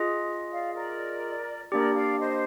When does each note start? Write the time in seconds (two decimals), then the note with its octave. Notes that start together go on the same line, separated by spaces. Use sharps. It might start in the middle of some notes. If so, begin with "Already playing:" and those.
Already playing: F4 G#4 D#5
0.51 D5 F5
0.75 A#4 D5
1.71 A#3 D4 G4 A#4 D5
1.95 D5 F5
2.19 C5 D#5